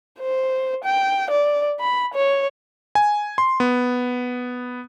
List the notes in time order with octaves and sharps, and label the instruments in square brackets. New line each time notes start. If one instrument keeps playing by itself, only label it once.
[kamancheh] C5
G5
D5
B5
C#5
[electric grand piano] G#5
C6
B3